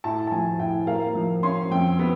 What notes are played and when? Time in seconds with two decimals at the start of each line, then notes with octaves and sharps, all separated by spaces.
0.04 A2 A5
0.27 A5
0.32 F3 G#5
0.59 A2 G5
0.87 A#3 F5
1.15 F3
1.43 C#4 C6
1.71 F2 G5
1.99 B3